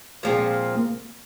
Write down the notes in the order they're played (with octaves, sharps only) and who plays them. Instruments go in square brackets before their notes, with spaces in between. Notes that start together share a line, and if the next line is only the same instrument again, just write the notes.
[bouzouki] A#2 F3 C4 [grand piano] G#3
[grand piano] A#3